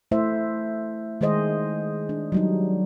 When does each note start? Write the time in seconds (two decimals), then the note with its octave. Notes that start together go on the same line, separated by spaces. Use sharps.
0.11 A3 E4 C5 E5
1.21 D#3 G#3 G#4 C5 D#5
2.09 D4
2.32 F#3 G3 D#4